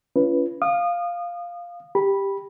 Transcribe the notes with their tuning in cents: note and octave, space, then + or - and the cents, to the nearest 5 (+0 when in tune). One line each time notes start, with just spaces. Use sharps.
C#4 +25 F4 -40 B4 +0
F5 +0 D#6 -30
G4 +5 B5 -10